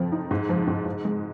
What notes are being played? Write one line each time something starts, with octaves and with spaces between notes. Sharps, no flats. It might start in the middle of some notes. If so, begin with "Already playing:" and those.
Already playing: F2 F3
D#4
G#2
F3
G#2
G#2
G#3